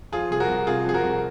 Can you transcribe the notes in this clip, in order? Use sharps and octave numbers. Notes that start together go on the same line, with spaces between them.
F3 F4 G#4
C2 G#4
F#4 A#4
C2
C3 F4 G#4
F3 G#4
F#4 A#4
C2